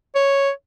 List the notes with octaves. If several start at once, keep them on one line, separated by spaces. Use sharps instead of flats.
C#5